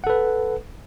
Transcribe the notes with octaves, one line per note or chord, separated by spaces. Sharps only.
A4 B4 F#5